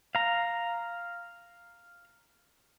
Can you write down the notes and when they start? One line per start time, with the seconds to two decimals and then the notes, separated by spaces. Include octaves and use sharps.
0.15 F5 A#5